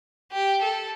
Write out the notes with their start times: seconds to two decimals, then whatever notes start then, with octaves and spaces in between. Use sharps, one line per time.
0.33 G4
0.62 A4